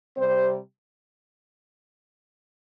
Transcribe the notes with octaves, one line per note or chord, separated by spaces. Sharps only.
C3 G3 C4 C5